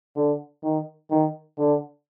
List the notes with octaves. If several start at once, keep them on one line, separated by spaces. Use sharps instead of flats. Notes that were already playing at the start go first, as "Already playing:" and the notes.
D3
D#3
D#3
D3